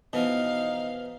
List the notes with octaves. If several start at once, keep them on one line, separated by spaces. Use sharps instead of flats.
B2 E3 F3 B3 D#4 F5